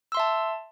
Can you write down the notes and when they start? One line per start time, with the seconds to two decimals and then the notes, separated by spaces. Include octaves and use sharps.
0.12 E6
0.15 C6
0.17 E5
0.20 A5